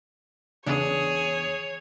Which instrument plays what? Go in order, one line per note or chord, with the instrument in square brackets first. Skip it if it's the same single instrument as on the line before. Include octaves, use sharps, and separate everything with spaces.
[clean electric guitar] E2 [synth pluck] C#3 D4 [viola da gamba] G#4 [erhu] C#5